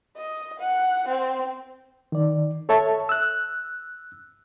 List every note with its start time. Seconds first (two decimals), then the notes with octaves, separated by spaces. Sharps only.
0.17 D#5
0.60 F#5
1.08 C4
2.12 D#3 D5
2.69 A4 C#5 E5 A5
3.09 E6 F#6